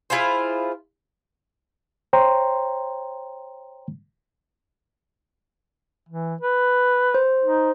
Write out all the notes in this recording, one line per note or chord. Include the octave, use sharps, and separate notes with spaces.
E4 F4 G#4 C5
C5 C#5 G5 A#5 C6
E3
B4
C5
D#4